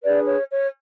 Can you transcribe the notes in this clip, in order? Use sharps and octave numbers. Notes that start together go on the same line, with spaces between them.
D4 G#4 B4 D5
C#5
C#5